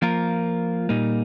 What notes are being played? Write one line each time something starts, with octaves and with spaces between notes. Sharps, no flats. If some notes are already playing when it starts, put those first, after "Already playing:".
F3 A#3 F4 A#4
A#2 G3 A#3 D#4